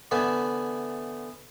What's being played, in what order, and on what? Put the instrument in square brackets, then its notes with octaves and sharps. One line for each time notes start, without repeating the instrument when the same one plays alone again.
[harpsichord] D3 E3 A3 B3 E5 G#5